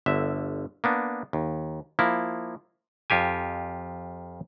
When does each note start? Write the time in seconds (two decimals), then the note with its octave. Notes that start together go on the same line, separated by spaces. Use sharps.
0.06 G1 D3 E5
0.84 A#3 B3 D4
1.33 D#2
1.99 F3 A#3 E4
3.10 F2 F4 G4 G#5